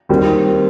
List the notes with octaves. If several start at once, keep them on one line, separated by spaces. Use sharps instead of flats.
D#2 D#3 G3 C4